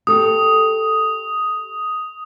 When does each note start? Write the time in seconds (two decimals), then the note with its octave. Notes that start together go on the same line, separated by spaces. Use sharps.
0.07 G4 A4 D#6